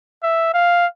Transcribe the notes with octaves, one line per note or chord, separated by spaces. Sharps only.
E5
F5